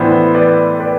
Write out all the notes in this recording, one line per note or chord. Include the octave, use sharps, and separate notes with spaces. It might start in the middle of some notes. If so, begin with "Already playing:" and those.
Already playing: A2 E3 B3 D4 C5
B4 D5
B4 D5